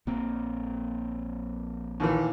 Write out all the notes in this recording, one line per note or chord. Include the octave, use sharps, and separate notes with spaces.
A#1 A#3 C4
D#2 A#2 E3